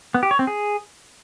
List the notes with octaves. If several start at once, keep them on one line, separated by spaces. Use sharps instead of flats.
B3
G4
C#5
C4
G#4